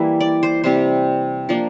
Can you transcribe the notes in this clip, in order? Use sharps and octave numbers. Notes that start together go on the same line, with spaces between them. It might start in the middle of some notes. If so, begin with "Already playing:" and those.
Already playing: E3 G3 A#3 E4
D5
C5
C3 G3 C4 C5
F3 A#3 D4